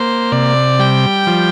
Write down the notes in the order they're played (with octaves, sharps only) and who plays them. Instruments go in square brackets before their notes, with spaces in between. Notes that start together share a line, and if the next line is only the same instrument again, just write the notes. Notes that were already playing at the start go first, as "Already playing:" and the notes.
Already playing: [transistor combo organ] A#3 [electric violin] C5
[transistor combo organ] C3 [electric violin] D5
[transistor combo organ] G3 [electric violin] G5
[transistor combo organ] F3